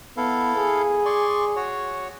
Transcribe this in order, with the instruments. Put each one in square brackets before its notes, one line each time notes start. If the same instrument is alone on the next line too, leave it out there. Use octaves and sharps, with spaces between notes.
[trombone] B3 [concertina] E4 A4 F5
[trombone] G#4
[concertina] D5 C6 C#6
F#4 C#5